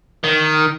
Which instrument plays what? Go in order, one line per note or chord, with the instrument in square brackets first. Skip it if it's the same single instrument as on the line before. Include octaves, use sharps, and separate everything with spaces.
[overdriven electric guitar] D#3